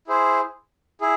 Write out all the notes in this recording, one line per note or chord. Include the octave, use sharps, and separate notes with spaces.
E4 G#4 C5
E4 G#4